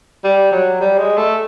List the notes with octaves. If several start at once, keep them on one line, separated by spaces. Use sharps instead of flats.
G3
F#3
G3
G#3
A3